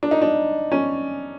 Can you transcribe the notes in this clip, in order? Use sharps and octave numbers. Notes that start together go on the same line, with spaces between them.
D4
D#4
D4
C#4